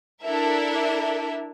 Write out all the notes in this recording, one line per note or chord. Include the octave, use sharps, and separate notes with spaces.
D4 E4 A4 A#4 E5